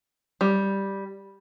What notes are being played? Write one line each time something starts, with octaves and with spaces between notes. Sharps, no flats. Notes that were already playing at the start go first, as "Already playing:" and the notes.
G3